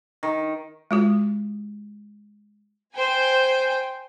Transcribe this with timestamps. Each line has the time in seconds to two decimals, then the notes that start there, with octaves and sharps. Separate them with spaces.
0.23 D#3
0.91 G#3 F4 F#4
2.94 C5 G5 G#5